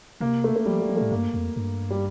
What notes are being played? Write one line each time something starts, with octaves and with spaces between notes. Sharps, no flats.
C3 A#3
A3
A3
F3 G3
G3
F3
A2 A3
G2 A#3
F2
G2
G3